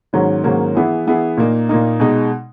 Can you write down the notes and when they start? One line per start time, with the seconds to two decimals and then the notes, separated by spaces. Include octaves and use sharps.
0.13 G#2 D#3 F#3 A#3 C#4
0.44 G#2 D#3 F#3 A#3 C#4
0.75 E3 B3 E4 G#4
1.07 E3 B3 E4 G#4
1.37 A#2 A#3 D#4
1.69 A#2 A#3 D#4
2.00 B2 G#3 D#4